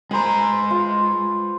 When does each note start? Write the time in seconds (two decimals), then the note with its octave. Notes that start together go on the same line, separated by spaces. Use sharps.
0.11 G#3 B4 C5 G#5 A#5
0.71 F4